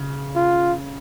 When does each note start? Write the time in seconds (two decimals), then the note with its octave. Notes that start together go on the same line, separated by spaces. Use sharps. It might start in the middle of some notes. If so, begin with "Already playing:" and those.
Already playing: C#3
0.36 F4